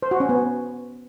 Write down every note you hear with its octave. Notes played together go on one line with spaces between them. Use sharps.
C5
F#4
C#4
B3